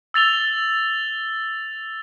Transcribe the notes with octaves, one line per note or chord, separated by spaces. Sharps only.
E6 A6 F7 G7